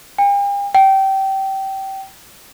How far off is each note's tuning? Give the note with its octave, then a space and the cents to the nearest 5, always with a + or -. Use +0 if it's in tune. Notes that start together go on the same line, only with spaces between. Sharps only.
G5 +45
G5 -20